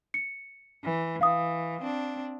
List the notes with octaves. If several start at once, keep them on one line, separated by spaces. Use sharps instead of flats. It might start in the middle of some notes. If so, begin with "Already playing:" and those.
C#7
E3
E3 F5 D#6
C4 D4